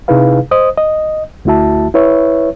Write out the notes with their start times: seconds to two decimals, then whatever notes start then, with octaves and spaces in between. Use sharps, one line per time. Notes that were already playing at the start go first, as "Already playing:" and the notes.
0.08 C3 D#4 E4 G#4 B4 F5
0.51 C5 D#5 D#6
0.77 D#5
1.45 D2 A3 E4 F#4 E5 A5
1.94 E4 B4 C#5 E5